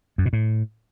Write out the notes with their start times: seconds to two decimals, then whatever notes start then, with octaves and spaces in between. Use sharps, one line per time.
0.18 F#2
0.26 B2
0.33 A2